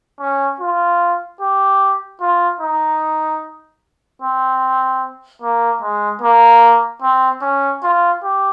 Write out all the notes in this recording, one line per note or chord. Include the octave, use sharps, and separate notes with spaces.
C#4
F4
G4
F4
D#4
C4
A#3
G#3
A#3
C4
C#4
F4
G4